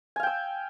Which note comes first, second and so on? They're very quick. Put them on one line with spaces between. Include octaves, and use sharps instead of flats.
G#5 F5 G5 E6